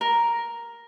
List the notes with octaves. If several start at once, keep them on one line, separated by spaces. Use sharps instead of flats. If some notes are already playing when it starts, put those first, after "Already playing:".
A#4